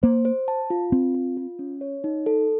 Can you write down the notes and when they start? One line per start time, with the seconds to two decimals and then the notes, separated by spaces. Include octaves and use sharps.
0.03 A#3 C5
0.25 C5
0.48 A5
0.70 F4
0.92 C4 F4
1.15 F4
1.37 F4
1.59 C#4
1.81 C#5
2.04 D#4
2.26 A4